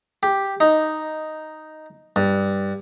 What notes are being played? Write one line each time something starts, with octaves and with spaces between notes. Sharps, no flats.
G4
D#4
G2